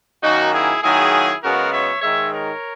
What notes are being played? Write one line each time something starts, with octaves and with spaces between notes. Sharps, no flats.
F#2 D#3 A#3 D#4 F#4
E4 G#4
D#3 F#3 A#3 E4 G#4
F#2 C#3 G#3 B3 F#4 A#4
C#5 E5
G#2 D#3 G#3 C#5 E5
A#4 C#5